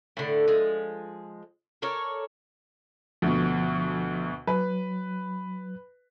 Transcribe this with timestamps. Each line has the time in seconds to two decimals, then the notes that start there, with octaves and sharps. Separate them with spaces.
0.17 A2 D3
0.48 F3 G#3
1.82 A4 A#4 C#5 D5
3.22 D2 B2 F3
4.47 F#3 B4